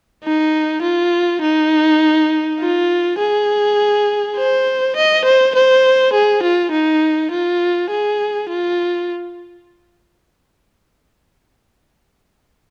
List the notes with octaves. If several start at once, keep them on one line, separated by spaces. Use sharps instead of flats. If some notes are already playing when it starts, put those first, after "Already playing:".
D#4
F4
D#4
F4
G#4
C5
D#5
C5
C5
G#4
F4
D#4
F4
G#4
F4